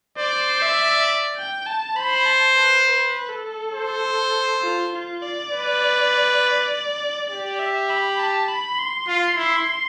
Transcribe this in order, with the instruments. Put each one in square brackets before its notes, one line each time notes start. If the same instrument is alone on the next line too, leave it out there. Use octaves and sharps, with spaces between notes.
[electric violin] C5 [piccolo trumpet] D5
[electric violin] E5
G5
A5
[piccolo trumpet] C5 [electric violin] B5
[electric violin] A5
B4
B4
A4
[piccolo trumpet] C5
[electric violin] F4
F4
D5
[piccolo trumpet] B4
[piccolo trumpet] G4 [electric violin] D5
[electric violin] E5
B5
A5
B5
C6
[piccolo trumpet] F4
E4